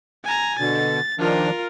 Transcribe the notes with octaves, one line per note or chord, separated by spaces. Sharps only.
G#5 A#5
B2 D3 A6
D#3 F3 D4 F4 A#4